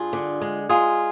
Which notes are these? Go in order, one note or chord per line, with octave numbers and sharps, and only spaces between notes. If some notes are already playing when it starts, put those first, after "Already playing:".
Already playing: G2 F4 G#4
D3
G#3
G#3 F4 G#4